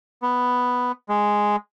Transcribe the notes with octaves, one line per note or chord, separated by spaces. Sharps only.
B3
G#3